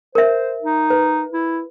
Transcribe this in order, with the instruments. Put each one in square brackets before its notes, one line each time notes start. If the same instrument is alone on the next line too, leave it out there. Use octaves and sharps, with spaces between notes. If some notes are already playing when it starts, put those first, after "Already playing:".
[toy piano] A#4 E5 [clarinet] C5
[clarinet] D#4
[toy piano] B4
[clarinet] E4